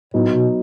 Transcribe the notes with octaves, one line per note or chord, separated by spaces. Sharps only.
A2 F#3 B3 D#4
B2